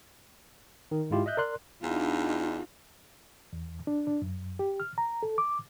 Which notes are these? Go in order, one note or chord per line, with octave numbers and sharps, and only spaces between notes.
D#3
G#2 G#3 E4 F4 G4
D#5 E5 F#6 G6
A#4 D5 C6 F#6
E2 D4 D#4 F4
E2
D4
D4
F#2
G4
F6
A#5
A4
D6